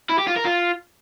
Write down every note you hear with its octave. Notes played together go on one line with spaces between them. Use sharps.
E4
G4
F4
A#4
F4